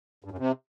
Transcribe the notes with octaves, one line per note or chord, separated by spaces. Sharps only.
G2
F#2
C3